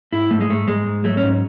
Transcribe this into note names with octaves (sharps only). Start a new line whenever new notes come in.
G#2 E4
G#2 A3
G#3
G#2 A3
G#2 G#3
G#2
F#3 A3
C#4
G#2